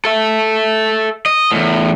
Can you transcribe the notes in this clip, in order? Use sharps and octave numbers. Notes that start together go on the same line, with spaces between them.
A4 E5
D#5
E2 A2